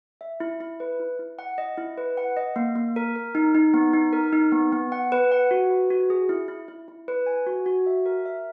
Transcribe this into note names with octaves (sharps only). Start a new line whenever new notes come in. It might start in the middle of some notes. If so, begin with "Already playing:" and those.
E5
E4
E4
B4
E4
E4
F#5
D#5
E4
B4
F#5
D#5
A#3
A#3
A#4
A#4
D#4
D#4
B3
D#4
A#4
D#4
B3
B3
F#5
B4
F#5
F#4
B4
F#4
G#4
E4
E4
E4
E4
B4
G#5
F#4
F#4
E5
A#4
E5